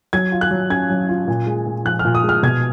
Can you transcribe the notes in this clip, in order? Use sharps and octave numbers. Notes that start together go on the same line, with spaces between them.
F#3 G#6
F4
F#6
F#3
C#4 G#6
F#3
F4
A#2
G#3
A#2
F3 F#6
F6
A#2
D#6
G#3
F6
B2 G#6